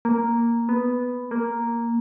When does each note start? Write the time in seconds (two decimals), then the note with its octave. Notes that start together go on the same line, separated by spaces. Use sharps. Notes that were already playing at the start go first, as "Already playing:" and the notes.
0.05 A#3
0.69 B3
1.31 A#3